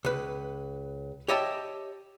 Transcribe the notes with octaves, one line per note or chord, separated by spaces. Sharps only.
C#2 B4
G4 C#5 D#5 E5 G5 A5